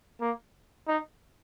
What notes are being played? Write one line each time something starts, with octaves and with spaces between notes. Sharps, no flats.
A#3
D#4